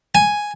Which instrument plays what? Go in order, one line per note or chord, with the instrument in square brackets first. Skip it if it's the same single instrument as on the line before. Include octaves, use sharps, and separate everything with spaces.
[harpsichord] G#5